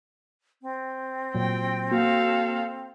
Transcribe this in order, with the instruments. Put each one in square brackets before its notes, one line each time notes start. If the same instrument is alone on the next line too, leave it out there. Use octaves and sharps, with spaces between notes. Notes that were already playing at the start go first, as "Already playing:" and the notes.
[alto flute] C4
[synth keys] A#2 F#3 [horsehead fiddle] G5
[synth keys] A#3 F#4 [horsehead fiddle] A4 F5